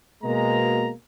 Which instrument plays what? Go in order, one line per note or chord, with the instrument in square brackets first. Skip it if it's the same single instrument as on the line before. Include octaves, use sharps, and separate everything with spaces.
[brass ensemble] B2 G#3 A#3 A#5